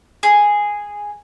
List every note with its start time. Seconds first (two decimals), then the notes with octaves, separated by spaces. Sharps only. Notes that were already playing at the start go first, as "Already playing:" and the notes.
0.23 G#4